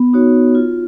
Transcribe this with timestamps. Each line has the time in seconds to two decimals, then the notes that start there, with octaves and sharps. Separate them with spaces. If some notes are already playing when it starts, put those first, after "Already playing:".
Already playing: B3
0.13 D#4 F#4 C#5
0.55 F4